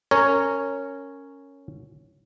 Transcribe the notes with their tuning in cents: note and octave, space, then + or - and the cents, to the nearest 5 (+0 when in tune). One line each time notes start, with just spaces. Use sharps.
C#4 +0 A#4 -15 C#5 +0